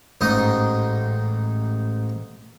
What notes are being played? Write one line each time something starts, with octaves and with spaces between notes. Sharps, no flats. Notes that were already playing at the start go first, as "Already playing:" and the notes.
A1 G#2 D#4 D#5